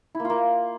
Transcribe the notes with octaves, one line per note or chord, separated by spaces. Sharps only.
E4
A#3
F4
A#3